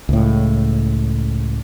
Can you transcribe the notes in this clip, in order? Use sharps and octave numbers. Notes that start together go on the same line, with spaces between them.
C#2 A2